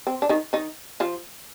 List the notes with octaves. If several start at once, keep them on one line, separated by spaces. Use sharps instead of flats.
C4
D4
D#3 D#4
D#3 D#4
F3 F4